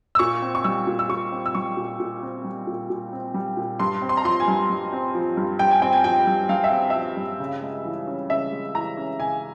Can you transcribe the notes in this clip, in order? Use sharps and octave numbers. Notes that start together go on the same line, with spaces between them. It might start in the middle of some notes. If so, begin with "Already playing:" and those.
E6
A#2 C#6
C4
C#6
G3 E6
A#2
E6
A#2 C#6
C4
E6
G3 C#6
A#2
A#2
C4
G3
A#2
A#2
C4
G3
A#2
G2 C6
C4
C6
A#5
F3 C6
G#5
G2
G2
C4
F3
G2
G2 G5
G#5
C4 G5
G#5
F3 G5
G2
G2 F5
E5
C4
F3 E5
G2
C#3
G#3
E3
C#4
C#3 E5
G#3
E3 A#5
C#4
C#3 G#5